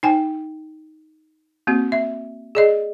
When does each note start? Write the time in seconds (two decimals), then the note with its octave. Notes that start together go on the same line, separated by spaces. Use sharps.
0.03 D#4 G5 G#5
1.67 A#3 C4 F#4
1.92 E5
2.55 G#4 D5 D#5